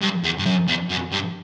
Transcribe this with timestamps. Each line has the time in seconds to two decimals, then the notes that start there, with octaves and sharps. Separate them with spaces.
0.01 G2
0.23 E2
0.38 G2
0.46 F#2
0.68 E2
0.90 F#2
1.12 G2